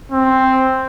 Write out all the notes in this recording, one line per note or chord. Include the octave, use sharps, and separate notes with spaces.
C4